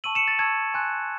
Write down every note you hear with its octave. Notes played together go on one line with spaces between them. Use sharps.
A5 C#6 E6 D#7 F#7
C#7 E7
A6
A5 C#6 E6 G#6
G#5 C6 F#6